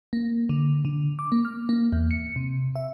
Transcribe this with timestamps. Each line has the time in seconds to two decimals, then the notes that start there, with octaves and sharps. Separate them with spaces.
0.13 A#3
0.49 D3
0.85 D3
1.19 D6
1.32 A#3
1.45 F6
1.69 A#3
1.92 E2
2.11 C#7
2.36 C3
2.76 E5